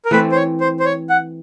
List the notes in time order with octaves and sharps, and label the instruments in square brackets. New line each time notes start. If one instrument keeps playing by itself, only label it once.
[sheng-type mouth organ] A#4
[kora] E3 A3 C4 [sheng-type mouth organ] B4
[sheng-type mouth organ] C5
C#5
C5
C5
C#5
F#5